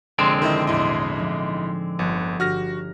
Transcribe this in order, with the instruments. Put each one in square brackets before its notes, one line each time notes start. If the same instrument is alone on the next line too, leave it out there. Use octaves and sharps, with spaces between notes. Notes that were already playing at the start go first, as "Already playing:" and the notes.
[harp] F1 A#1 G#5 [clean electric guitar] D3 G#3 C4 [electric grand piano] C6 D7
[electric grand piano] D#3 E4 D#5
[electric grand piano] B1 E4 D#5 [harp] E2 A2
[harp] F3 A3 D#4
[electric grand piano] G1 [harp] F3 F#6 C#7
[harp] G1 G4 D#7 [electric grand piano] F#4 F6 A#6